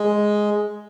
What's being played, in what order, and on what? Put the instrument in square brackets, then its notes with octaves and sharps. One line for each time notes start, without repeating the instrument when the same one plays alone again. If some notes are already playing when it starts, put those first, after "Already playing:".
Already playing: [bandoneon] G#3